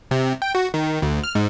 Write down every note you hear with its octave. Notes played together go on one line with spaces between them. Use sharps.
C3
G5
F#4
D#3
D2
F6
G#2